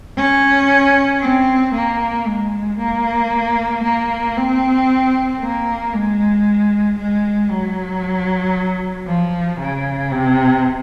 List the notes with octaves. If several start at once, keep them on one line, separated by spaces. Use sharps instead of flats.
C#4
C4
A#3
G#3
A#3
A#3
C4
A#3
G#3
G#3
F#3
F3
C#3
C3